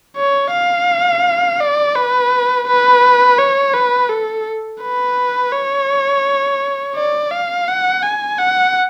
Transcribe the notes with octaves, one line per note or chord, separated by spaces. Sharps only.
C#5
F5
D5
B4
B4
C#5
B4
A4
B4
C#5
D5
F5
F#5
G#5
F#5